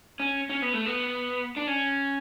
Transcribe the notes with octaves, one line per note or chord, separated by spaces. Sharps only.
C#4
C#4
B3
A3
B3
D4
C#4